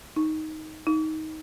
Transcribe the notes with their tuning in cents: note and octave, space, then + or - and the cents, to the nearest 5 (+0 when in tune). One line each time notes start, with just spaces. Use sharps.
D#4 +10
D#4 +15